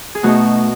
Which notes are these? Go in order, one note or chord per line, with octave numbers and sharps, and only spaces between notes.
G#4
B2 A3 D#4 F#4